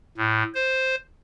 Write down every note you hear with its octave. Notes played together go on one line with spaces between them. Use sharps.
A2
C5